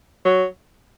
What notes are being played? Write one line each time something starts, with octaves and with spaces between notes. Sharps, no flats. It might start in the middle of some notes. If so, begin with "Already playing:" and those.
F#3